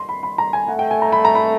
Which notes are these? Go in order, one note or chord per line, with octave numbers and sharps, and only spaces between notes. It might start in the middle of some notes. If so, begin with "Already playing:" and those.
Already playing: C6
B5
B5
A#5
G#5
A3 F#5
G5
G#5
A#5
B5
A#5
B5